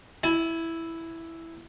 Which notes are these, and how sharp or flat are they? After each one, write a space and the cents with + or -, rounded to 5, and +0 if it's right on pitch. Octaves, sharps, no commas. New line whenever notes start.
E4 +0 G#5 +40